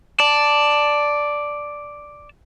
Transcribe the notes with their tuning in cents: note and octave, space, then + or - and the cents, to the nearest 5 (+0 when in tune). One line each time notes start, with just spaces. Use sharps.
D5 +0 A5 +0